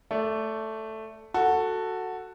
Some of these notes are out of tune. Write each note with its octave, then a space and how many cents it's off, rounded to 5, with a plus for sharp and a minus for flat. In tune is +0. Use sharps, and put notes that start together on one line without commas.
A3 +0 D5 -20
F#4 +0 A4 +10